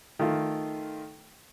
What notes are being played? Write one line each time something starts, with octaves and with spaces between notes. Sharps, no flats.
D#3 A3 F4